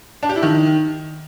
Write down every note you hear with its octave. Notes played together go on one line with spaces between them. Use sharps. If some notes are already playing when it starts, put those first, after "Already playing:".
D4
G4
E4
D#3